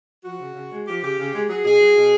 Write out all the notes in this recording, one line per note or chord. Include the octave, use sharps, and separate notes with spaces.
F3 F#4
C#3
C#3
G#3
F3 G4
C#3 G4
C#3
G#3
F#3 G#4
B2 G#4
F#3
B2